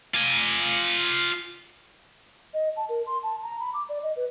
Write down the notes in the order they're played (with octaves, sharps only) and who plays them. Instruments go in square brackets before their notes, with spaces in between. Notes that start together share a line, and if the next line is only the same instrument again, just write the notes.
[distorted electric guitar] F4 G#5
[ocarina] D#5
A5
A#4
C6
A5
A#5
B5
D6
D5
D#5
B4